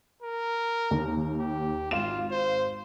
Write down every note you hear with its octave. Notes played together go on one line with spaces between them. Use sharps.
A#4
D#2
G4
G#1 F4 F5 E7
C5